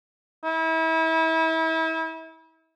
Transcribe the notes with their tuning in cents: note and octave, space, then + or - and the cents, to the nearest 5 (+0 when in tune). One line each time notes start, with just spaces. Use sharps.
E4 -35